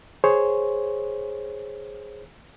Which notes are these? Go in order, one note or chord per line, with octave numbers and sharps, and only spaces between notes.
G#4 C5 C#5